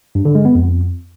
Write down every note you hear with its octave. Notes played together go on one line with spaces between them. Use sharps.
G2
D3
G#3
B3
F2